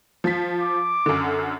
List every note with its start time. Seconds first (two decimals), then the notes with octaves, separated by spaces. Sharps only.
0.24 F3 B6
0.60 D6
1.06 F#2 D3